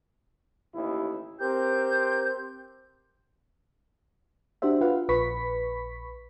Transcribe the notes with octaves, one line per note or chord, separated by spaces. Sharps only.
A1 D#2 E4
C4 G4 A#4 G6
D4 F#4 G4 C5 E5
F4 B4 F5 F#5
A#1 B4 B5 C#6 B6